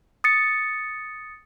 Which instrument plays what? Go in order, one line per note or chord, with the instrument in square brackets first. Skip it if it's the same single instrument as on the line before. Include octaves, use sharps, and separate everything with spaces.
[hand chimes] D#6 A6 C#7